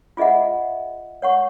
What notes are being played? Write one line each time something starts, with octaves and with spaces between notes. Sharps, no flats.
F4 G#4 D#5 E5 F#5
C#5 F#5 C#6